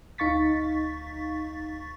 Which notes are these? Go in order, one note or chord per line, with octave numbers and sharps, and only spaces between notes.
D2 D#4 F5 C#6 A6 B6